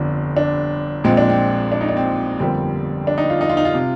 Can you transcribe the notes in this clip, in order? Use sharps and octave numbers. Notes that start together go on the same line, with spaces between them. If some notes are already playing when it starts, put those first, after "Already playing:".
Already playing: G1 F2 D3 D4
D4
A#1 A#2 G#3 C4
D4
C4
D4
D#4
D4
C4
G1 F2 D3 G3 A#3 C4
D4
D#4
F4
D#4
F4
D#4
F4
C3